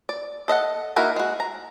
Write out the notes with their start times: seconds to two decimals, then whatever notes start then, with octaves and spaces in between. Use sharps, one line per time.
0.09 D5
0.48 A4 D#5 E5 F#5
0.96 A#3 D#4 E4 F#4 A#4
1.16 G#3 F#4
1.40 A#5